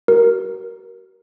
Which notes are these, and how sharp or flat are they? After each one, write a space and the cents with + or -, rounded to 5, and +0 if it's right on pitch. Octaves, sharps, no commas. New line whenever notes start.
F#4 +45 A#4 +0